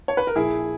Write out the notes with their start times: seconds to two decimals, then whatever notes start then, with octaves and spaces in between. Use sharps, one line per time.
0.08 C#5
0.17 B4
0.27 A#4
0.36 A#1 E4 G#4